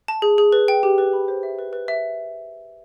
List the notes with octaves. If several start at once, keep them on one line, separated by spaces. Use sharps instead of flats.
A5
G#4
G#4
B4
G5
G4
B4
B5
C5
E5
B4
B4
E5